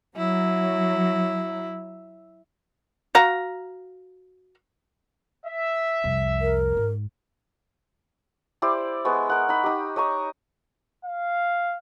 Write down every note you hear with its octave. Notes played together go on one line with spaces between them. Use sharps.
F#3 E4
F#4 F5 A#5
E5
C2 F2
A#4
G#2 G#3
E4 G4 C5 D5
G#3 B3 C#6
A#4 F#5
D#4 B5
D#4 G4
C#5 D#5 A#5 C#6
F5